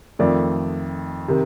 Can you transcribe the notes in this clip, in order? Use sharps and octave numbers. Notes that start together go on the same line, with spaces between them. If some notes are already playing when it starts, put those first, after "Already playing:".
F2 D#3 A3 D5
C3 D#3